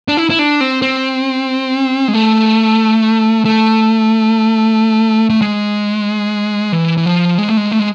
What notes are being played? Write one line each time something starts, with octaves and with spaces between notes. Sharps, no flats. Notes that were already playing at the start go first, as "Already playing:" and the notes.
D4
E4
E4
D4
C4
C4
G#3
A3
A3
A3
G#3
E3
E3
F3
G#3
A3
G#3
A3
G#3